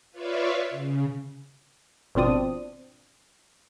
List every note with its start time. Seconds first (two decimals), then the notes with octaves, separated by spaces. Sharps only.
0.11 F4 B4 C#5 D5 E5 F5
0.70 C#3
2.15 G#1 B2 F3 C4 D4 D#6